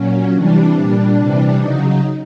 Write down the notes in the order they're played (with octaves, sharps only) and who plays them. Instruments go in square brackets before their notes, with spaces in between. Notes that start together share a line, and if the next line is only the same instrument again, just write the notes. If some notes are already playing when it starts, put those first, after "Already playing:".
Already playing: [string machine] A#2 F#3 C#4
C3 E3 G3 D4
A#2 G3
C3 E3 G3
C#3 F#3 D#4